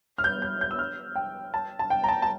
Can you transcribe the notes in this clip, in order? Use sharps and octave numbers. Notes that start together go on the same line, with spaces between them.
F6
G6
G6
G6
E6
F6
G5
A5
A5
G5
A#5
A5
A5